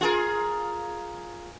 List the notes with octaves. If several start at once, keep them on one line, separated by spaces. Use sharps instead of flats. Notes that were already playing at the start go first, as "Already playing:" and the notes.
F4 G#4 A#4